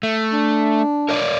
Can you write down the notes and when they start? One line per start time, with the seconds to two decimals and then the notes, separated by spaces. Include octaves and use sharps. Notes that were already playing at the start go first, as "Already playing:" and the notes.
0.03 A3
0.33 D4
1.09 A#4 C#5 D5